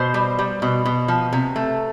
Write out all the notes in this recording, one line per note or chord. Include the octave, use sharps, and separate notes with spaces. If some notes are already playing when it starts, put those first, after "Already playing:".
Already playing: B2 C5
G3
G3
B2
B2
F3
C3
A3